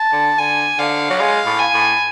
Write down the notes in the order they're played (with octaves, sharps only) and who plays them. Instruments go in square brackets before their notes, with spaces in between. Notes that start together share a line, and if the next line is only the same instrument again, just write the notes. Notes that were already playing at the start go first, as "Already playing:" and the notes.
Already playing: [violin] A5
[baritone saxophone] D3
[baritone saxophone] D3 [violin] G#5
[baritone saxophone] D3 [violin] F5
[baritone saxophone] F#3
[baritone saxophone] G#3 [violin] F5
[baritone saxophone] A2
[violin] G#5
[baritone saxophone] A2